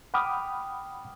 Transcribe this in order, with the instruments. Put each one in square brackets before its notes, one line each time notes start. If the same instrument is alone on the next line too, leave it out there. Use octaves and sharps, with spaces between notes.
[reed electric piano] F#5 G5 B5 D6 D#6 F6